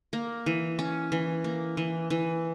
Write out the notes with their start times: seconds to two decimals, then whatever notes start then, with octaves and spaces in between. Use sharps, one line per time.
0.13 A#3
0.46 E3
0.79 C#4
1.12 E3
1.44 A#3
1.77 E3
2.10 E3